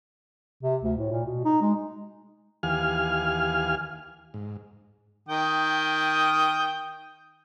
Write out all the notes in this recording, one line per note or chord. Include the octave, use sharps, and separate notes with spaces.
C3
D2
A2
A#2
B2
D#4
G#3
D#2 E3 G4 F5 G#5 F6
G#2
D#3 G5 D#6